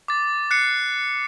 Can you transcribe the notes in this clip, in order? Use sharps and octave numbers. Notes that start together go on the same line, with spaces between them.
D6 A6
F#6 C7 C#7